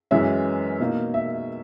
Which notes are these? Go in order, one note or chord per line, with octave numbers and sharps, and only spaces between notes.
F#2 E3 G#3 C#4 E5
B2 A#3 D#4
E5